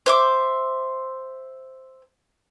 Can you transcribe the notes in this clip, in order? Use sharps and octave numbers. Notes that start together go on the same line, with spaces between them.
C5 E5 D6